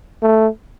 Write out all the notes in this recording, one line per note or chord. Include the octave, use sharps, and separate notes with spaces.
A3